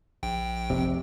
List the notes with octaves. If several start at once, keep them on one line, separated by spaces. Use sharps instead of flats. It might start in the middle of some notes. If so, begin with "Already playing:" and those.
A#1 G5
F1 C3